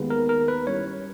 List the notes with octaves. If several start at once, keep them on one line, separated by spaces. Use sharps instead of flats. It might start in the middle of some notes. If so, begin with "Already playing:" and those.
Already playing: D#2 D#3 G#3 B3
A#4
A#4
B4
G2 G3 C#4 E4 C#5